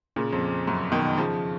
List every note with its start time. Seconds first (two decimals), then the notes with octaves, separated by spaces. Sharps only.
0.16 A#2 C#3
0.33 F2
0.67 F#2
0.92 B2 D#3
1.18 C#3 F3